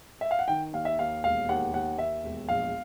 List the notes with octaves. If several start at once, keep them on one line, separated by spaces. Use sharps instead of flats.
E5
F5
F#5
D#3 G5
D#2 F5
E5
D#2 F5
E1 F5
D#2 F#5
D#2 F#5
D#2 E5
E1
A#1 F5